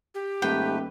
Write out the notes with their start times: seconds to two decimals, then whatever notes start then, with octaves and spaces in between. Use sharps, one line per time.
0.15 G4
0.42 D#1 G#2 A3 B4 G5